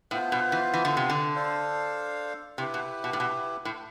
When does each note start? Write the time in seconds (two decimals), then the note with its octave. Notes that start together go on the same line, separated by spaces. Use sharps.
0.11 A2 B3 F4 C5
0.32 B2
0.52 E3
0.74 E3
0.85 D3
0.97 C3
1.10 D3
1.35 D4 A4 C5 F5
2.58 C3 E4 G4 B4
2.74 B2
3.04 B2
3.13 A2
3.20 B2
3.65 A2